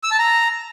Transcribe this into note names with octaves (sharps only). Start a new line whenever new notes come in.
E6
A5
A#5